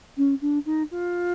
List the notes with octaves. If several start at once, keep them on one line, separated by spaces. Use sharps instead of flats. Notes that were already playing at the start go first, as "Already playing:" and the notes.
C#4
D4
D#4
F4